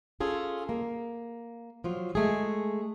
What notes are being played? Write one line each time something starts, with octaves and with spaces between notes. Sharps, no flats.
C#4 F4 G#4 A4
A#3
F3 F#3 F4
G#3 A3 G#4